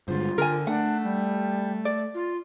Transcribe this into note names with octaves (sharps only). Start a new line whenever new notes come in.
G2 D3 G#3 F4 C5
D3 A#4 G#5
A3 D4 F#5
G3
D5
F4